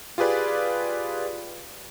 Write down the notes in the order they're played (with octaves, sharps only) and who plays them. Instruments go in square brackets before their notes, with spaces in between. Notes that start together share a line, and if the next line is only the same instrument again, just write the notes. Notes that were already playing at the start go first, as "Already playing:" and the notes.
[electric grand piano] F4 G4 G#4 B4 D5